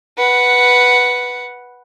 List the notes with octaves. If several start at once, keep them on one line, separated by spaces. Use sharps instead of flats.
B4 F#5